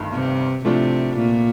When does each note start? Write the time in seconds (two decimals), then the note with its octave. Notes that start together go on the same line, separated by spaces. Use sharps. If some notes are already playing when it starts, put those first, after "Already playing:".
Already playing: G1 G2 D#3 A3
0.13 C3
0.65 A2 C3 F3 A3 D4 F4
1.17 A#2